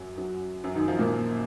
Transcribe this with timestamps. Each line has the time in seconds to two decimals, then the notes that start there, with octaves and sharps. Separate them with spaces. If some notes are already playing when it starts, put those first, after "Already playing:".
Already playing: F#2 F#3
0.18 F#2 F#3
0.64 F#2 F#3
0.75 D#3 D#4
0.88 F3 F4
0.99 A#2 A#3